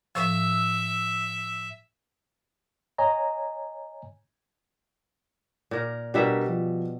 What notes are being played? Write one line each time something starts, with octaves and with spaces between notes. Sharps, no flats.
A2 F3 E5 E6
C#5 D#5 G#5 A#5
A#2 A#4
B2 G3 D4 G4 A#4 E5
F3